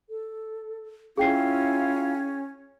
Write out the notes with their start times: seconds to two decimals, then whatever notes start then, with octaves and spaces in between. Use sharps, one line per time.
0.08 A4
1.17 C#4 E4 F4 G#4 F5 G5 C7